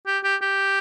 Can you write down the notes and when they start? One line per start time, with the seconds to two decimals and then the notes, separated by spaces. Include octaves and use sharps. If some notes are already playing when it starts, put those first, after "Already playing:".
0.07 G4
0.24 G4
0.42 G4